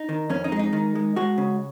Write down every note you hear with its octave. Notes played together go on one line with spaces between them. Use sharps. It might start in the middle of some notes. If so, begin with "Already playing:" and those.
Already playing: D#4
D#3
F2 C#4
D#4
G#3
D#4
D#3
G#3
G#3 F#4
C#3